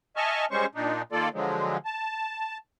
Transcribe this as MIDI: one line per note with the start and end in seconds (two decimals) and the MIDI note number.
0.17 0.45 75
0.17 0.45 76
0.17 0.45 80
0.17 0.45 81
0.17 0.45 85
0.17 0.45 89
0.51 0.66 55
0.51 0.66 56
0.51 0.66 61
0.51 0.66 72
0.51 0.66 85
0.75 1.02 46
0.75 1.02 62
0.75 1.02 63
1.12 1.29 51
1.12 1.29 58
1.12 1.29 65
1.12 1.29 69
1.12 1.29 74
1.33 1.77 50
1.33 1.77 53
1.33 1.77 54
1.33 1.77 56
1.85 2.58 81